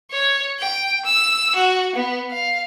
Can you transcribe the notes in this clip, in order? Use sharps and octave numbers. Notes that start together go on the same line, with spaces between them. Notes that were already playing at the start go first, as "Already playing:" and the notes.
C#5
G5
E6
F#4
B3
F5